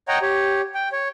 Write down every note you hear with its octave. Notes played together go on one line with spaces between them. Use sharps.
C#5 D#5 F#5 G5 A#5
G4 C#5
G5
C#5